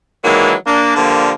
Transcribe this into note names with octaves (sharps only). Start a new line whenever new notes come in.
D#3 E3 F#3 G#3 A#3 D4
A#3 D4
D3 F3 G3 A#3